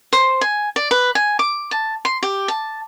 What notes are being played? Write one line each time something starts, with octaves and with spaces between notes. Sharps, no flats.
C5
G#5
D5
B4
G#5
D6
A5
C6
G4
A5